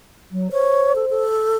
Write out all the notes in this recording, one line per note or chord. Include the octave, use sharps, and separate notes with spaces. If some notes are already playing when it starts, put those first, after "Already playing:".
F#3
C5 C#5
A4
A4